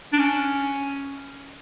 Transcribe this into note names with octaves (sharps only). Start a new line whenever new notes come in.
D4
C#4